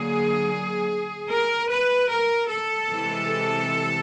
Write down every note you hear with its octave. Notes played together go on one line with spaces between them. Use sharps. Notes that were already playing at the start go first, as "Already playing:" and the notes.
Already playing: D3 F#3 A#3 G#4
A#4
B4
A#4
A4
C3 E3 G#3